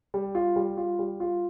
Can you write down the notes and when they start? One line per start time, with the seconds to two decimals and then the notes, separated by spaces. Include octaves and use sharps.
0.14 G3
0.35 F4
0.56 G3
0.77 F4
0.99 G3
1.20 F4